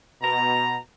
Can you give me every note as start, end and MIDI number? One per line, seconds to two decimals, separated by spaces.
0.22 0.77 47
0.22 0.77 82